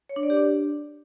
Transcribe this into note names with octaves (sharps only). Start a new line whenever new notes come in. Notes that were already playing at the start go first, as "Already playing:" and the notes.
C#5
D4
D5
G4
D4